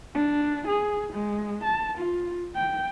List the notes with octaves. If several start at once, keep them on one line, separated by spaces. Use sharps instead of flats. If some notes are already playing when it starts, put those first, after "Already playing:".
D4
G#4
G#3
A5
F4
G5